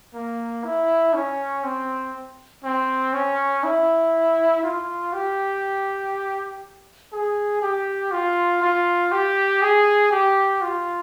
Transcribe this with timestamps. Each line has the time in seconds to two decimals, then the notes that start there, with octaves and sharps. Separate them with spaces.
0.14 A#3
0.64 E4
1.14 C#4
1.63 C4
2.64 C4
3.13 C#4
3.63 E4
4.63 F4
5.13 G4
7.12 G#4
7.62 G4
8.12 F4
8.62 F4
9.12 G4
9.61 G#4
10.11 G4
10.61 F4